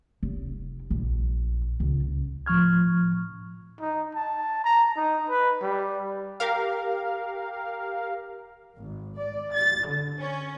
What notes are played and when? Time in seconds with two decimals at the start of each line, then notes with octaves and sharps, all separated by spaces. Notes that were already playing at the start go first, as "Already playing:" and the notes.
0.23 F1
0.90 A#1
1.80 C#2
2.46 A2 F3 C#6 F6 G#6
3.80 D#4
4.15 A5
4.64 A#5
4.96 D#4
5.30 B4
5.62 G3
6.40 G4 A#4 F5
8.77 G#1
9.18 D5
9.54 A6
9.87 D3
10.19 C#4